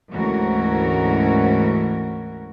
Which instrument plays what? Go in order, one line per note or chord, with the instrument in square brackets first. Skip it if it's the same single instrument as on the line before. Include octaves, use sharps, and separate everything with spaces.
[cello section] D2 G#2 E3 C#4 F#4 A#4